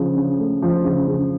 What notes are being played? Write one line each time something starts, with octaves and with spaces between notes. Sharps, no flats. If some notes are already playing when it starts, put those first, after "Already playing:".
Already playing: C#3 F3
C#3
A3
F3
C#3
C#3